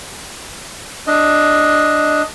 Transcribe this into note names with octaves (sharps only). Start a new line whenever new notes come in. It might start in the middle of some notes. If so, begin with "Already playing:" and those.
D4 D#5